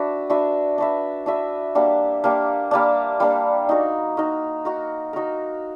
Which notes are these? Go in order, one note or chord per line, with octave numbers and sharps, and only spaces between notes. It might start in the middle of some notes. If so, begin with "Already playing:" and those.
Already playing: D4 F#4 B4 E5
D4 F#4 B4 E5
D4 F#4 B4 E5
D4 F#4 B4 E5
G3 A#3 D4
G3 A#3 D4
G3 A#3 D4
G3 A#3 D4
D#4 F#4 A#4
D#4 F#4 A#4
D#4 F#4 A#4
D#4 F#4 A#4